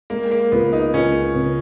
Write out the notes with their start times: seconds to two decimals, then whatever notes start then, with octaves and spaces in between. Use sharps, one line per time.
0.10 G#3 A#3
0.31 A#3
0.52 C#2 B3
0.73 D#4
0.94 C#2 C#4
1.35 C#3